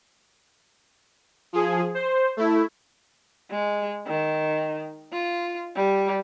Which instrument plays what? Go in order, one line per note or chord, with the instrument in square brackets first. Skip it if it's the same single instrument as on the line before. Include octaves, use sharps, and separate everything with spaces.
[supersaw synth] F3 G#4
C5
A3 E4
[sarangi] G#3
D#3
F4
G3